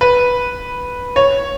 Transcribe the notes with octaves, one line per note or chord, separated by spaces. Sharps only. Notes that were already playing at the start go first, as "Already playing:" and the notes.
B4
C#5